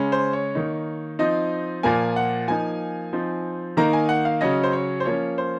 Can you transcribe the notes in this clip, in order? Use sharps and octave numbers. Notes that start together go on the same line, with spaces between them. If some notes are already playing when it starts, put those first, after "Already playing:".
Already playing: C#3 G#3 C#4
C5
C#5
D#3 A#3 D#4
F3 C4 D#4 D#5
A#2 F3 A#3 G#5
F#5
F3 A#3 D#4 G#5
F3 C4 D#4
D#3 A#3 D#4 A#5
G#5
F#5
F5
C#3 F#3 C#4 D#5
C5
C#5
C5
F3 A#3 C#4 C#5
C5